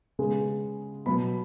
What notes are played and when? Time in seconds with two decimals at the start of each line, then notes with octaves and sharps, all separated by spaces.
0.19 C#3 G#3 B3
1.06 B2 F#3 B3 B5